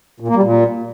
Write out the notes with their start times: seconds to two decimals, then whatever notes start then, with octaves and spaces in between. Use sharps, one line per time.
0.20 A#2
0.28 A#3
0.35 G3
0.43 A#2